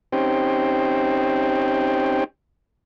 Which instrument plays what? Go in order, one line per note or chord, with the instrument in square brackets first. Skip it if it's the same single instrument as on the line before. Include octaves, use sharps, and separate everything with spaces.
[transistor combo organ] C4 C#4 D#4 G4 C5 G5